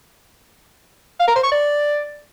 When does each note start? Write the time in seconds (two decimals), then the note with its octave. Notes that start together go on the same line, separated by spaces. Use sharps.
1.20 F5
1.28 A#4
1.36 C5
1.44 C#6
1.51 D5